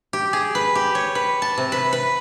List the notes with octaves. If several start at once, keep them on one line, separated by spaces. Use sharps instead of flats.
G4
G#4
B4
G4
C#5
B4
A5
C3
B4
B4